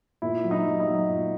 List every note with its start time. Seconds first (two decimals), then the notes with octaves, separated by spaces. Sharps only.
0.22 A#2 E4
0.44 F#3
0.51 D#4
0.66 F#3
0.80 D#4
0.87 F#3
1.08 A#2